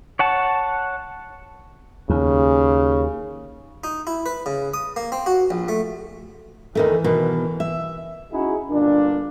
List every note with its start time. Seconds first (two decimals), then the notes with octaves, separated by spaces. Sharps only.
0.19 C#5 F#5 A5
2.10 D#2 C#3
3.84 D#4
4.07 E4
4.26 B4
4.46 C#3
4.74 D#6
4.96 A#3
5.12 C4
5.26 F#4
5.50 A#1
5.68 A3
6.75 E2 D#3 E3 A3
7.04 B2 D#3
7.60 E5
8.32 C#4 D#4 E4 F#4 G#4
8.70 G1 A#2 A#3 D4